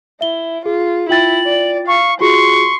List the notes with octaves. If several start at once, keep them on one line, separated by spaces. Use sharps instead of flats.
E4 E5 G7
F4 G#4
E4 F4 G5 A6 F#7
D5
F5 C#6
F4 F#4 G#4 C6 C#6